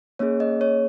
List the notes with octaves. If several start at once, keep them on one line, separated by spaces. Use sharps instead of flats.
A#3 C#4 G#4 C#5
D#5
C#5